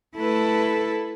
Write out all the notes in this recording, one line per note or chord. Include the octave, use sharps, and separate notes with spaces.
A3 E4 A4 B4